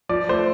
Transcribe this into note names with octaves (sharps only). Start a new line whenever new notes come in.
F3 D5
A3 C5